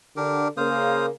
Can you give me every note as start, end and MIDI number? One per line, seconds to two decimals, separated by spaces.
0.17 0.49 50
0.17 0.48 62
0.17 0.48 67
0.17 0.48 70
0.57 1.11 49
0.57 1.11 58
0.57 1.06 72
0.57 1.06 77
0.57 1.06 87